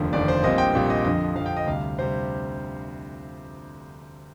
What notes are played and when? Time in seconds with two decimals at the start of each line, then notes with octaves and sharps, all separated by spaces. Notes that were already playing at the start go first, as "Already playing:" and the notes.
Already playing: F1 D#2 D3 F3
0.13 F1 D#2 D3 F3 D5
0.28 C5
0.44 A#1 A#2 G3 C4 D#5
0.58 G5
0.74 A#1 A#2 G3 C4
0.90 D#5
1.05 F2 D3 F3 D#5
1.36 F3 F5
1.39 F2 D3
1.46 G5
1.57 D#5
1.66 D2 C3 G3 F5
1.99 C3 G3 C5